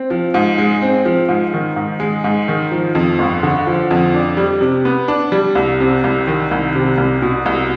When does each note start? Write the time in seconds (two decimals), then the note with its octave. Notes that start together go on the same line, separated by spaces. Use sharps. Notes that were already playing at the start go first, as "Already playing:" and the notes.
Already playing: C4
0.10 F3
0.34 G#2
0.58 G#3
0.82 C4
1.05 F3
1.29 G#2
1.54 D#3
1.76 G#2
2.00 G#3
2.24 G#2
2.48 D#3
2.71 F3
2.95 F2
3.19 G1
3.43 D3
3.67 F3
3.91 F2
4.14 D4
4.37 G3
4.61 C3
4.85 B3
5.08 D4
5.32 G3
5.55 C2
5.80 C3
6.04 C2
6.27 D#3
6.51 C2
6.75 C3
6.98 C2
7.22 B2
7.46 C2